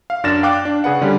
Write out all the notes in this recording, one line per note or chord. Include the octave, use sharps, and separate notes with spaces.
F5
F#2 D4 F6 A6 A#6 E7
F5 G5 D6 F#6
D4
C#3 G#4 B4 F#5
D3 G3 C#4 D4